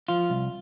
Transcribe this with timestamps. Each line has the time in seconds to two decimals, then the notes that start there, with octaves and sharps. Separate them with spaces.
0.08 F3 F4
0.30 C2